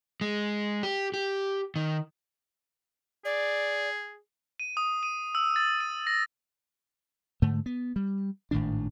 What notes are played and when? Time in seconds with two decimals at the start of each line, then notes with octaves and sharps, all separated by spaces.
0.21 G#3
0.83 G4
1.14 G4
1.76 D#3
3.25 G#4 D5
4.60 D#7
4.77 D#6
5.03 D#7
5.35 E6
5.56 A6
5.81 D#7
6.07 A#6
7.42 G#2 D3 A3
7.66 B3
7.96 G3
8.51 G#1 A2 D#3 D4